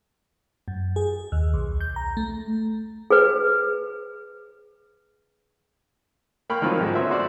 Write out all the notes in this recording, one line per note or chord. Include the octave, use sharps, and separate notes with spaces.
F#2
G#4
D#2
B1
G6
A#5
A3
G#4 B4
A#3 G5 B5 C#6 F6
D#3 F3 F#3 C4 F4
G#2 D3
B3 C#4 C5 E5
F#4 C5 D5